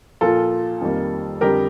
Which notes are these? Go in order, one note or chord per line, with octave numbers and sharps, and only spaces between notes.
A#2 F3 A#3 F4 A4
F2 D#3 G3 A#3
F2 D3 G3 G4 A#4